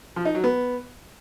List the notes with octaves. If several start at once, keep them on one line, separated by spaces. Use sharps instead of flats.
F3
D#4
F#3
B3